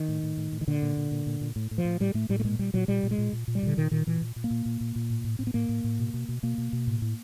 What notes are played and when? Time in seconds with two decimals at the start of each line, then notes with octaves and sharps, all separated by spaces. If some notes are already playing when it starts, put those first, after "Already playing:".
Already playing: D#3
0.08 A2
0.23 A2
0.37 A2
0.52 A2
0.61 D#3
0.67 A#2 D3
0.82 A#2
0.97 A#2
1.11 A#2
1.26 A#2
1.41 A#2
1.56 A2
1.71 A2
1.78 F3
1.85 A2
2.00 A2 G3
2.14 A2 A3
2.29 A2 G3
2.40 A3
2.44 A#2 G#3
2.59 A#2 G3
2.74 A#2 F#3
2.88 A#2 G3
3.03 A#2
3.11 G#3
3.18 A#2
3.33 A#2
3.48 A#2
3.55 G3
3.63 A#2 D3
3.77 A#2 D#3
3.91 A#2 D#3
4.07 A#2 E3
4.21 A#2
4.36 A#2
4.44 A#3
4.51 A#2
4.66 A#2
4.81 A#2
4.96 A#2
5.10 A2
5.24 A2
5.39 A2 C4
5.47 B3
5.54 A2 A#3
5.69 A2
5.84 A2
5.99 B2
6.14 B2
6.29 B2
6.43 B2 A#3
6.58 B2
6.73 B2
6.87 A2
7.02 A2